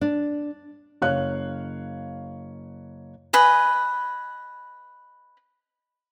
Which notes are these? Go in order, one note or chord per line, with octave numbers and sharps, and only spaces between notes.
D4
F#1 C#5 F5 F#6
B4 D#5 G#5